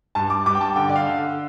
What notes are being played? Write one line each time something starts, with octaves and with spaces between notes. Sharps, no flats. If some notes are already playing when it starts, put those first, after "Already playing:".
G2 A5
D6
G2 D6
G5
A5
D3 G5
D5
F5
D3